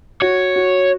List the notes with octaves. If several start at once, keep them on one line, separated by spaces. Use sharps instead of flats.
F#4 C#5
F#4